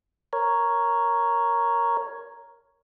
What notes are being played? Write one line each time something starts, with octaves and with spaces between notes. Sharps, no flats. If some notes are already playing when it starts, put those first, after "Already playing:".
A#4 C#5